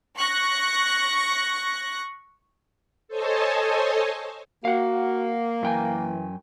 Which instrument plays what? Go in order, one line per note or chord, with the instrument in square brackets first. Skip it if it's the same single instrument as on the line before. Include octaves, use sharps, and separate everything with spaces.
[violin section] C#6 F#6 A#6
[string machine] A4 C5 C#5 D#5 G#5 A5
[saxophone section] A#3 [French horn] F#4 [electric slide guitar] F5 F#5
[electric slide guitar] F#2 G5 G#5 [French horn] E3